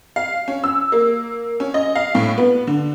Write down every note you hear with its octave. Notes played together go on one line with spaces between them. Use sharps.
F5
C#4
E6
A#3
C#4
D#5
F5
A2
B3
D3